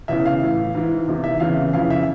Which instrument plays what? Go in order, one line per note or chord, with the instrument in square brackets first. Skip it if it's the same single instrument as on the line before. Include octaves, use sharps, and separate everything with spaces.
[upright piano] E2 C#3 E3 E5
F5
A2 E3
G#2 E3
E2 C3 D#3
E5
E2 C#3 E3 F5
F2 C#3 E3 F5
E5